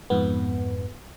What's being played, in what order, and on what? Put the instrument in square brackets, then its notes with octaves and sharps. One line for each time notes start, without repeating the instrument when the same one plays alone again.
[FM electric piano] F2 G#2 B3